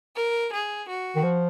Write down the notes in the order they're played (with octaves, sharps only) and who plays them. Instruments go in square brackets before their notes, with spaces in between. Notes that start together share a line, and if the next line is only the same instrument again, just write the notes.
[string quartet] A#4
G#4
F#4
[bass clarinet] D#3
F3